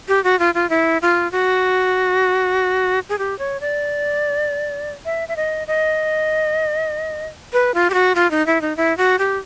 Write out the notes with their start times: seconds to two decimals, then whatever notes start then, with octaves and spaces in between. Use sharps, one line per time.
0.08 G4
0.24 F#4
0.39 F4
0.55 F4
0.70 E4
1.02 F4
1.32 F#4
3.09 G#4
3.18 G4
3.39 C#5
3.61 D5
5.05 E5
5.28 E5
5.36 D#5
5.68 D#5
7.53 B4
7.74 F4
7.90 G4
7.94 F#4
8.15 F4
8.31 D#4
8.47 E4
8.61 D#4
8.77 E4
8.97 F#4
9.19 G4